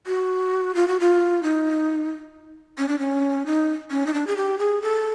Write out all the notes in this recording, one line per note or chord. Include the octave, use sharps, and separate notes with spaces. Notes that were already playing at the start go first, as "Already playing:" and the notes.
F#4
F4
F#4
F4
D#4
C#4
D4
C#4
D#4
C#4
D#4
D4
G#4
G4
G#4
A4